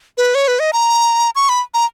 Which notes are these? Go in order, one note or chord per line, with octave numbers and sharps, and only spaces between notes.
B4
C#5
B4
D#5
A#5
C#6
B5
A#5